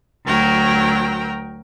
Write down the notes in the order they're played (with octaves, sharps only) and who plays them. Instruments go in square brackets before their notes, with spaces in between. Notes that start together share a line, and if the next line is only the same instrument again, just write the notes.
[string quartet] D2 F#3 A#4 G5